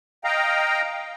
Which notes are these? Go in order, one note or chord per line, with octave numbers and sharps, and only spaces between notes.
D#5 F5 G5 A#5